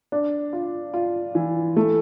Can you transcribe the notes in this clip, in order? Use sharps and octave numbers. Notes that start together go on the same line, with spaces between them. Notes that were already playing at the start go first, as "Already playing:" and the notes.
D4
F4
F4
E3
A3